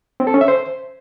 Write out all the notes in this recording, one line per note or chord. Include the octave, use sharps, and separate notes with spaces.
C4
A4
C#4
E5
C5